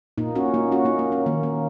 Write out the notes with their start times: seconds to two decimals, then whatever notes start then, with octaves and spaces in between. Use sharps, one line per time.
0.18 A#2 A#3 D#4
0.35 C#4 F#4
0.54 A#3 D#4
0.72 C#4 F#4
0.85 A#3 D#4
0.99 A#3
1.12 C#4
1.26 D#3 A#3
1.43 A#3